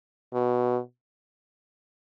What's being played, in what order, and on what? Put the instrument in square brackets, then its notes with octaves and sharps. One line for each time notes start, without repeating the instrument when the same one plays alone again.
[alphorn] B2